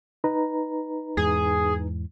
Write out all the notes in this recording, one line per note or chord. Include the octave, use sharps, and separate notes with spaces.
D#4 B4 A#5
E2 G#2 G#3 G#4